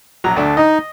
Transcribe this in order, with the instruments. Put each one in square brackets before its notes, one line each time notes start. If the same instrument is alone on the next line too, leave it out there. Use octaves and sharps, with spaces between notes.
[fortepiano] A#1 F#3 A#5
D2 A3 D4
[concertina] D#4 [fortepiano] D#5